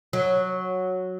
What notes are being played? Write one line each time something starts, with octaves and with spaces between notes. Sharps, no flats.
F#3